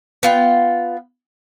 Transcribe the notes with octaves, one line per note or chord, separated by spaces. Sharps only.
B3 F4 G5